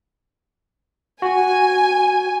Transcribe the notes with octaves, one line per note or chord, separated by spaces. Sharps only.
F#4 G#5